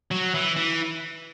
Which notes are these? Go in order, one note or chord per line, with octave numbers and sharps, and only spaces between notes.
F#3
E3
E3